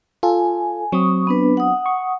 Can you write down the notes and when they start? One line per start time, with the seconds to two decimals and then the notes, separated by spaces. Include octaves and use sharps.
0.23 F4 A4 G#5
0.92 F#3 C4 C#6 D#6
1.27 B3 D4 B4
1.57 F#5 D#6
1.86 C#6